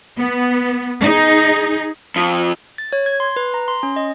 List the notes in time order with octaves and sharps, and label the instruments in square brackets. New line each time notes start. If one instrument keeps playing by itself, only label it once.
[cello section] B3
D#4 G#4
[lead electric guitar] F2
[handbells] A6
C#5
G#6
C6
B4
A#5
C6
C#4
D#5